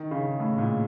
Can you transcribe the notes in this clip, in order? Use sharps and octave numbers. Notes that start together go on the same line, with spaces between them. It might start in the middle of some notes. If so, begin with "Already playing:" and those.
Already playing: D#3
C#3
A2
A#2